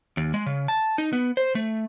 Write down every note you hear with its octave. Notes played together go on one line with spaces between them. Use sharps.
D#2
G#3
C#3
A5
D#4
B3
C5
A3